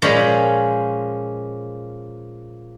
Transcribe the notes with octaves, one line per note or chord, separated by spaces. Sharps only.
A#2 F3 G#3 C#4 B5